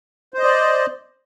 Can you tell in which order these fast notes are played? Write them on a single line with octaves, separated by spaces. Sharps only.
C5 D#5 D5